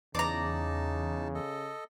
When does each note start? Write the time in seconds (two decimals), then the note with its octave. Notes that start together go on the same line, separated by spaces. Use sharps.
0.15 E2 C#3 D#4 D5 A5 A#5
1.35 A4 D#5